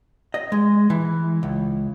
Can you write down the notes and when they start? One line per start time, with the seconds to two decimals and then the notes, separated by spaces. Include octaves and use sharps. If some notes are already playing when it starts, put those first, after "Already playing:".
0.34 D#5
0.52 G#3
0.90 E3
1.43 C#2